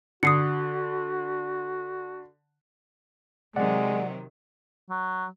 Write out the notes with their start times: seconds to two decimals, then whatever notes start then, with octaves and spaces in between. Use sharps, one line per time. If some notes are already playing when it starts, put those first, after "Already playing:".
0.23 D3 F#4 D#6 C7 C#7
3.56 C3 D#3 F#3 G#3 D5 F#5
4.90 F#3